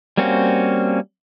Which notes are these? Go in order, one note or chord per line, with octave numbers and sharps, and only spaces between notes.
G3 A#3 C4 C#4 F#4